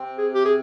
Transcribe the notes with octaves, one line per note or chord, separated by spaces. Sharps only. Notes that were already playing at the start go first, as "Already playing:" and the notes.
Already playing: C3 C4
G#4
G4
G#4